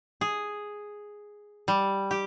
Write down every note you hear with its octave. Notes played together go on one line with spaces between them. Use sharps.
G#4
G3
G4